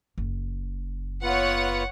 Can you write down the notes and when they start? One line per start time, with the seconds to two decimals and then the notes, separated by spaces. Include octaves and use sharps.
0.18 F#1
1.23 B3 F4 B4 C#5 F#5